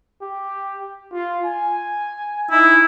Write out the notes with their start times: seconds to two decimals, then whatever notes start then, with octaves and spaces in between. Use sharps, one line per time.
0.21 G4
1.13 F4
1.46 G#5
2.51 D#4 E4